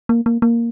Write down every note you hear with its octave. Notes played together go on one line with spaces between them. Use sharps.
A#3
A#3
A#3